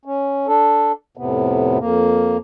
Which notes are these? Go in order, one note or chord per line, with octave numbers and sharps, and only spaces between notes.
C#4
D4 A4
F2 A2 C3 B3
F2 A#3